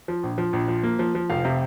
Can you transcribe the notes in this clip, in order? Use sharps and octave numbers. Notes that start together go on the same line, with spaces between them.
F3
A#1
F3
A#1
F3
A#3
F3
F3
F1 F5
C3